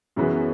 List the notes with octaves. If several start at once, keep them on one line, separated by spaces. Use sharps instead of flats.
F#2 E3 G#3 B3 F#4